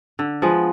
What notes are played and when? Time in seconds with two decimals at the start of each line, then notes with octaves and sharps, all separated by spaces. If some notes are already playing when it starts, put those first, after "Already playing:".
0.19 D3
0.42 F3 G#3 B3